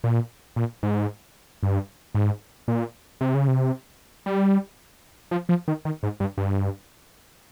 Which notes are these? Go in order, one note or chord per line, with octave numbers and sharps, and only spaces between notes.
A#2
A#2
G#2
G2
G#2
A#2
C3
C#3
C3
G3
F3
F3
D#3
D#3
G#2
G2
G2